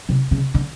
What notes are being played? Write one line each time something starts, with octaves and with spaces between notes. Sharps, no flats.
C3
C#3
D3